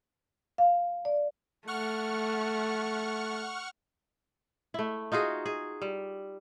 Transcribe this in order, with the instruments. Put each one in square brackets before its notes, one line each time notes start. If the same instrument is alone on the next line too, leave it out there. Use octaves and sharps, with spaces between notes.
[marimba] F5
D5
[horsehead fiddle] A3 [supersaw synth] F#5 C#6 F6
[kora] A3 E4
D#4 F4 F#4 G#4
G#4
G3